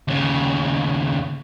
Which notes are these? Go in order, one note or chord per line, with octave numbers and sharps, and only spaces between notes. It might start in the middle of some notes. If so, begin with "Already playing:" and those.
D#2 C#3